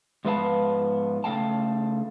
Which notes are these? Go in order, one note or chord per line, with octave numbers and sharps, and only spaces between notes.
G#2 F3 B3 B4 F5 A5
C#3 A3 B3 F5 G5 A5